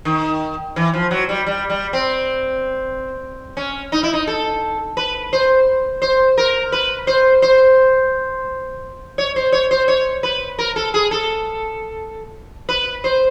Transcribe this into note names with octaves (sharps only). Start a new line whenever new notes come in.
D#3
E3
F3
F#3
G3
G3
G3
C4
C#4
D#4
E4
D#4
A4
B4
C5
C5
A#4
B4
C5
C5
C#5
C5
C#5
C5
C#5
B4
A#4
A4
G#4
A4
B4
C5